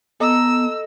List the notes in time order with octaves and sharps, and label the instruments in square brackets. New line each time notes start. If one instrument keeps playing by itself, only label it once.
[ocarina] B3 [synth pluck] A4 D#5 A#5 [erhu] E6